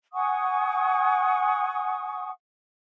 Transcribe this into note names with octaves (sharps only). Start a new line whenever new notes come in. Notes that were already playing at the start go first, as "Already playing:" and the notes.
F#5 G#5 C#6 D#6